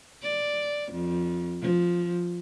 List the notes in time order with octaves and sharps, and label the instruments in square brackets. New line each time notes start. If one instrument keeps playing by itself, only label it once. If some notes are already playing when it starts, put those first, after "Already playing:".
[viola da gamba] D5
F2
F3